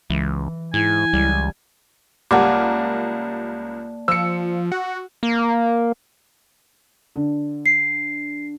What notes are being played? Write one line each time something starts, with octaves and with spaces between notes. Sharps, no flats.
C#2 E3
G#2 E4 G#5
C#2 G3
C#2 G3 A#3 A#4 D5 F#5 A5 D6
F3 E6 C#7
F#4
A#3
D3
C7